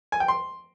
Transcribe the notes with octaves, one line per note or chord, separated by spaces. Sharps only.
G#5
G5
C6